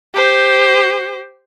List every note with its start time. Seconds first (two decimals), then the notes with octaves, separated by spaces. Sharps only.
0.14 G4 C5